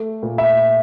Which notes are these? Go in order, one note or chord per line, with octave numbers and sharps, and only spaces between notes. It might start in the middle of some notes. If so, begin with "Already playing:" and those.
Already playing: A3
A#2
E5